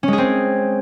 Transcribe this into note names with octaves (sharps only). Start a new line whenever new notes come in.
G#3 C4 C#4 G#4